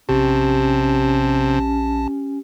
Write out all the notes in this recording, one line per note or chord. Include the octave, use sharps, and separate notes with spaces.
A#1 C3 C#4 G4 A5